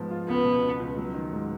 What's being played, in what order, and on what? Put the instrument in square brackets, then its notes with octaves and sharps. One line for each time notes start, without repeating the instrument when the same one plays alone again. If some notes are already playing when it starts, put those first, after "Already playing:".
Already playing: [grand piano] G#2 F3 B3
F4
[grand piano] C#2 [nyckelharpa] B3
[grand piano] B2
C#2
C#2
F#3
D#3
G#2